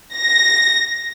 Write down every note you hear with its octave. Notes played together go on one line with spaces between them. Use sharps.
A#6